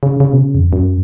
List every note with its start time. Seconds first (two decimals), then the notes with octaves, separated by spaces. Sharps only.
0.03 C#3
0.20 C#3
0.33 B2
0.38 C#3
0.55 F2
0.73 F#2